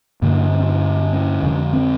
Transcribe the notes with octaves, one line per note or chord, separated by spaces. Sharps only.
G2 D3 A#3
C#4
C4
C#4
C#4
F2 D3
C4